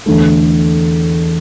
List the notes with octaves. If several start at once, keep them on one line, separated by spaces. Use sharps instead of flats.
E2 D3 A3